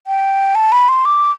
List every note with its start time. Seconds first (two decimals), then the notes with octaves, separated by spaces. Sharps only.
0.07 G5
0.55 A5
0.72 B5
0.89 C6
1.05 D6